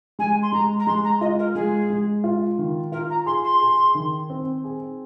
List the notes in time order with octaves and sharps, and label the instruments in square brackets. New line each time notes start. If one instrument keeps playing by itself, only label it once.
[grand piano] G#3 [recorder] G#5
[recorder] C6
[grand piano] G#3 [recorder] A#5
[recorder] A#5
[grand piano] G#3 [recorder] C6
[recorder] A#5
[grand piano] F4 [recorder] D#5
[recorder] A#4
[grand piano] G#3 [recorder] G#4
[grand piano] G#3
F4
D#3
[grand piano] F4 [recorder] A#4
[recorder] A#5
[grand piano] G#4 [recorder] C6
[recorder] C6
[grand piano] G#4
D#3
C4
G#4